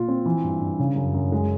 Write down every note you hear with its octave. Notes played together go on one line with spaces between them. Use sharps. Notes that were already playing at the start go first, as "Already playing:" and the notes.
Already playing: A#2 F4
C4
E3
G2
G2
C#3
F#2
F#2
G#3